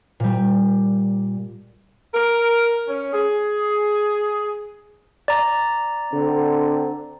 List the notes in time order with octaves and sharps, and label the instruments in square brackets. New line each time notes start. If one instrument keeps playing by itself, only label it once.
[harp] A#2 G3
[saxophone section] A#4
C#4
G#4
[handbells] D5 A#5
[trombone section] D3 C4